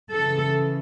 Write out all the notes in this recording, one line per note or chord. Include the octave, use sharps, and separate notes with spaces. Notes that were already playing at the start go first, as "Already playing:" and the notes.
C#3 E3 A4